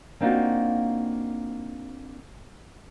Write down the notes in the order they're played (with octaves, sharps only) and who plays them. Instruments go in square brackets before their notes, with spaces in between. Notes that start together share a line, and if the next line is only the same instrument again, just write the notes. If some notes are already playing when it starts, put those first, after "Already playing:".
[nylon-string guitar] A#3 C4 D4 D#4 F4 F#4